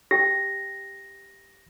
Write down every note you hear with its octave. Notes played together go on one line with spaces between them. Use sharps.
G4 G5 A#6